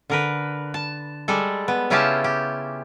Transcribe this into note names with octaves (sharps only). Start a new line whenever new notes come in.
D3 A#4 B4
A5
G3 G#3 A4
B3
C#3 C#4 E4 F4 G4 A5
G4